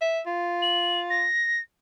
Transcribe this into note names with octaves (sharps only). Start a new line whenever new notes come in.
E5
F4
F#7
A#6